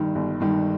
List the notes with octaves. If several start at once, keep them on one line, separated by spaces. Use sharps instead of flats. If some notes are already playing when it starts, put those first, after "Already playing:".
Already playing: G1 G2 D#3
G1
G2 D#3